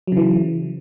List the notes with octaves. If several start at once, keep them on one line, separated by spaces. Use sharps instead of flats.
C#3 E3 F#3